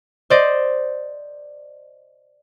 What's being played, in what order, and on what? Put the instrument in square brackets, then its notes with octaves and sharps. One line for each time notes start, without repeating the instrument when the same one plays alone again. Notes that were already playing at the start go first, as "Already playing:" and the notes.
[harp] C5 D5 D#5